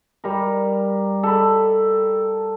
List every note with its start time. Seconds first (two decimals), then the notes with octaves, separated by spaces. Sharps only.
0.24 G3 A#4
1.23 A4 B5